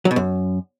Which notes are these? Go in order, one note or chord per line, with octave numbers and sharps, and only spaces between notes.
F#3
B2
F#2